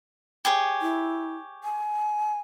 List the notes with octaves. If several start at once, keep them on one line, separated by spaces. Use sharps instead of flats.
G4 G#4 C#5
E4
G#5